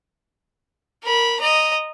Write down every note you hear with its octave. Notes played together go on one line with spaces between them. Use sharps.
A#4 B5
D#5 A#5